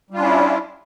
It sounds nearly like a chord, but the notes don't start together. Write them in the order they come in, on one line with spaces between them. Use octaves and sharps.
G3 F4 D4 C#4 E4